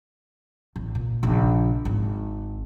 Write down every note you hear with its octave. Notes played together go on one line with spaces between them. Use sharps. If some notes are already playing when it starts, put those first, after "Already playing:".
A1
A#2
A#1 C#3
G#1